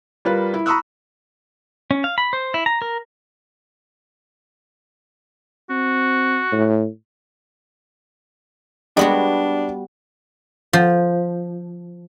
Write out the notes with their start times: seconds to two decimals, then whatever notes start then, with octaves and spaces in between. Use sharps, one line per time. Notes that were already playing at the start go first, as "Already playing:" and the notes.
0.25 G3 F4 A#4 B4
0.54 E4
0.66 A#5 B5 C#6 D#6 E6 F#6
1.91 C#4
2.04 F5
2.18 B5
2.33 C5
2.54 E4
2.66 A#5
2.82 A#4
5.70 C4 F#4
6.52 A2
8.97 G3 G#3 B3 D4 F#4 G4 D#5
10.73 F3